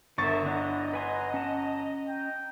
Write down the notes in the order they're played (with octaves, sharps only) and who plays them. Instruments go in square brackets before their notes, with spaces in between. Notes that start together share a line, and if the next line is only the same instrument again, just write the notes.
[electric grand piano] G1 C#6 A6 [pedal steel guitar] D3 [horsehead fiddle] A#4 E5
[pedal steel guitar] D4 E4 [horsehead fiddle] D#5 A#5 [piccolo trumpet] F#5
[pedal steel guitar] B4 G#5 C6 [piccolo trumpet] F#5
[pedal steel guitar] C#4 A5
[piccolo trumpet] G5